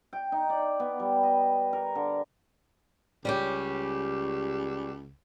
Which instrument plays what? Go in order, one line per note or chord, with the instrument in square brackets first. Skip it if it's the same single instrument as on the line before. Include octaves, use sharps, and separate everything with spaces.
[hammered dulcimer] G5
D#4
D5
B3
G3
D#5
A#4
D3
[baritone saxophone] C#2 [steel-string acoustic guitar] G3 C#4 G4